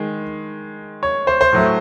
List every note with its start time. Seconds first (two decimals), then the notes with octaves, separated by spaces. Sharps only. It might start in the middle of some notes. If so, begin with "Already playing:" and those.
Already playing: D#3 G#3
1.03 C#5
1.27 C5
1.41 C5
1.53 A2 F#3 A3